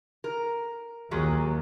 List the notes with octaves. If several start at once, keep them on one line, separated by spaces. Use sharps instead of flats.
A#4
D#2 A#2 F#3 G#3